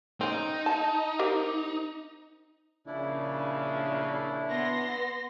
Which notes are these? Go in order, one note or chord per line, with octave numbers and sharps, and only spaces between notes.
C4 C#4 D#4
A5
C4 G4 A#4
A#1 A#2 C#3 D4 E4
B3 C6 A#6